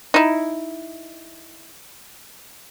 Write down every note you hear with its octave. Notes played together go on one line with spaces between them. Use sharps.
D#4 E4